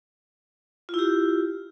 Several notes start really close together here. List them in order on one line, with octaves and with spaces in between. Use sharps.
F4 E4 G4